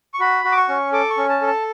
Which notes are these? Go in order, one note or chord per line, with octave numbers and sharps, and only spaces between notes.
C#6
F#4 B5
F#4
D6
C#6
C#4
A4 D6
C#6
C#4
A5
A4
A5